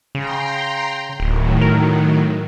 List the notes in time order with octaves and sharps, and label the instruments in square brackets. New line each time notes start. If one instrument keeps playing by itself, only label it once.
[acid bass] C#3 [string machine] G5 A#5 C6
[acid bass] D1 [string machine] A2 D#3 F#3
[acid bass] A#4